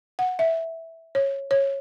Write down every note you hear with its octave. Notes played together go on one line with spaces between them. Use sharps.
F#5
E5
C#5
C#5